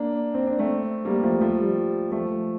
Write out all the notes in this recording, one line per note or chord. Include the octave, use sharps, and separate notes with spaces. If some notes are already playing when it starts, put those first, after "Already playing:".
Already playing: A#3 D4
C4
D4
A3 C4
G3 A#3
F3 A3
F3 A3
G3
F3 A3